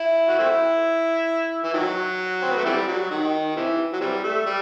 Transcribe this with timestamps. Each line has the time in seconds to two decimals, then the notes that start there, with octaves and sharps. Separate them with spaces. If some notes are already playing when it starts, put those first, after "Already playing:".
Already playing: E4
0.28 F#4
0.39 A3 C4 E4
1.64 E3
1.74 D#3 F#3
2.42 C4
2.50 B3
2.57 A3
2.66 C3 E3 G3
2.87 F#3
3.11 D#3
3.56 C3 E3
3.93 F#3
4.01 C3 E3 G3
4.24 A3
4.46 G3